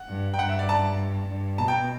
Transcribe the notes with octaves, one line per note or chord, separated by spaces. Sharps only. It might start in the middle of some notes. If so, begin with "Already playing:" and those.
Already playing: F#5
G2
G5
G2 F#5
E5
D5
A5
G2
B2 A5
G5